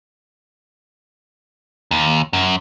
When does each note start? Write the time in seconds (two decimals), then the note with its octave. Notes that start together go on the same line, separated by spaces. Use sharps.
1.91 D#2
2.33 F#2